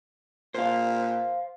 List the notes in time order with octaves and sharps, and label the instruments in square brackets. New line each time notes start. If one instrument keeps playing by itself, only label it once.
[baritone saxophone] A#2 [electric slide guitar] C5 F5